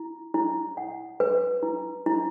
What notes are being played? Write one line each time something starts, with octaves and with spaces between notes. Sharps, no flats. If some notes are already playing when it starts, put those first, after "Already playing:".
Already playing: E4
E4
F#5
B4
E4
E4